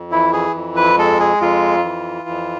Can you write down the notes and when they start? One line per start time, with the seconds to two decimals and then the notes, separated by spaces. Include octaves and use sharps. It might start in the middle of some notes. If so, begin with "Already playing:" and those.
Already playing: F2
0.12 E3 E4
0.33 G#4
0.55 F2
0.76 B4
0.98 G#3 A4
1.20 G#4
1.41 F2 F4
1.84 E3
2.28 F2